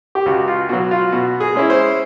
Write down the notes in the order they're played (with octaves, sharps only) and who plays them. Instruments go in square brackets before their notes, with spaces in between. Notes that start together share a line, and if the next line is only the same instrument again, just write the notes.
[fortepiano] G4
C#2 F#4
F4
B2 F#3 F#4
F4
B2 F#4
G#4
G#3 C#4 E4
C5